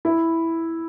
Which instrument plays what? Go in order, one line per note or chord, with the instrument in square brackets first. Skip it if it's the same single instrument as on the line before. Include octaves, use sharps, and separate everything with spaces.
[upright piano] E4